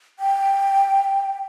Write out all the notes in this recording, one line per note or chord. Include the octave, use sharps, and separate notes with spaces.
G5